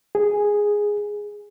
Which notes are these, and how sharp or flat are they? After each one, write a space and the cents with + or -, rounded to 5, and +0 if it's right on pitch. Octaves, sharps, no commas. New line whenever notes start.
G#4 -5